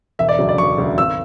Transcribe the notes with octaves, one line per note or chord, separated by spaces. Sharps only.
E1 E5
D5
D2 C#3 F#3
D5
E1 C#6
D2 C#3 F#3
G#1 E6